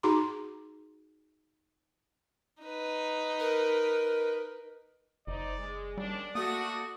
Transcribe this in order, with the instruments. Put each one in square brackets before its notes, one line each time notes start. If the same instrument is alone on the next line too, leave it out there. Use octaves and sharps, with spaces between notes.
[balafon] D#4 F#4 G#4 A#5 C6 D6
[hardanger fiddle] D#4 B4
[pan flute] A#4
[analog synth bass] F#1 [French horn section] D#4 C5 [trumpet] D5
[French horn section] G#3
[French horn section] D#2 C#4 D4 [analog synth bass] G3 [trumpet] D5
[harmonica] A3 D#6 [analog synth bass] A#3 [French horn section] F#4